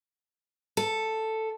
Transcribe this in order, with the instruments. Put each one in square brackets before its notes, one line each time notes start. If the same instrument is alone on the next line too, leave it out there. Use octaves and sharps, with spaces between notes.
[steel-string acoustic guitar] A4